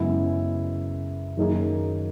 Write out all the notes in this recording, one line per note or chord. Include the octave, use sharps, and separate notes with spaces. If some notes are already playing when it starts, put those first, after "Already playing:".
Already playing: F#2 C#3 G#3 B3 E4
F#2 D#3 A#3 D#4 G#4